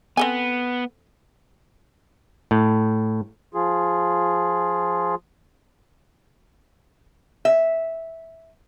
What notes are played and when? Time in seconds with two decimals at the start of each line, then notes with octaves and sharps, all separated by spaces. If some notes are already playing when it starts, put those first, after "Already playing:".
0.17 B3 C4 A4 G#5
2.51 A2
3.54 F3 F4 G#4
7.45 E5